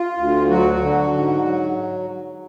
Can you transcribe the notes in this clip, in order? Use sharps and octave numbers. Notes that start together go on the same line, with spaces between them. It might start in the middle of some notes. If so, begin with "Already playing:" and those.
Already playing: F4
D2
F#3 F#4
D3
G#2
F#3